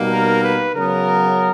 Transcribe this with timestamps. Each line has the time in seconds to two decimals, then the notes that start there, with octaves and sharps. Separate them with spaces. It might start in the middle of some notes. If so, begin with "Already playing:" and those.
Already playing: B2 G3 A#3 D#4
0.13 A#4
0.44 B4
0.75 C#3 F#3 B3 A#4